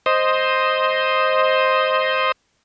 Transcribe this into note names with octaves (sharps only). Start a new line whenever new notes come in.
C5 D#5